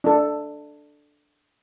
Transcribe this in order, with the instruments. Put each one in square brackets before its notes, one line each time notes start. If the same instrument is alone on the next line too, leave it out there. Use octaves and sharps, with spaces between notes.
[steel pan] D4 A4